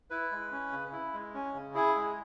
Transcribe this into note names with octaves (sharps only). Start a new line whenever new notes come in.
E4 B4
G#3
C#4
C#3
E4
G#3
C#4
C#3
E4 G#4
G#3